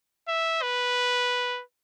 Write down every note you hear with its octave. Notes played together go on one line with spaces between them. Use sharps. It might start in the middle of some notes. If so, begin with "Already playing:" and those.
E5
B4